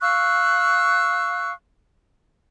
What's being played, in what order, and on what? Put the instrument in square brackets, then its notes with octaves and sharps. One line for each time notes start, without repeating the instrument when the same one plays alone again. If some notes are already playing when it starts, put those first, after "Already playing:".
[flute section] F5 C#6 E6 F#6